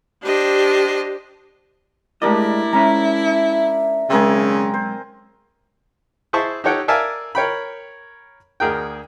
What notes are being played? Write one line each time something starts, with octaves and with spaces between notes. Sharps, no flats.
D4 G4 C5 D#5
G#3 A3 D4 E4 G4 A#4 D5 D#5
G#3 C#4 E5 A#5 B5
B1 C#3 G#3 C4 A#4 G#5
C5
E4 G#4 C5 E5 A5 C#6
D#4 G4 A4 C#5 F#5 G5
A#4 D5 E5 F5 G#5 A5
A#4 C#5 G5 B5
D2 G#4 A#4 G5